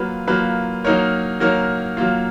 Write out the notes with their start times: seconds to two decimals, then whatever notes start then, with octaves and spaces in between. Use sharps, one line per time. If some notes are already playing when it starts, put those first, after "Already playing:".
Already playing: F#3 A#3 F4 B4
0.27 F#3 A#3 F4 B4
0.84 F#3 A#3 D#4 A#4 C#5
1.40 F#3 A#3 D#4 A#4 C#5
1.97 F#3 A#3 F4